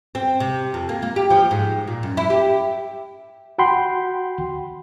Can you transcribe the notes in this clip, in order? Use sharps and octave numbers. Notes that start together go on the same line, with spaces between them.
C4
C3
F2
A#3
A#3
G4
F3
G#2
A#2
F#2
E4
G4
F#4 F#5 G5 B5 C6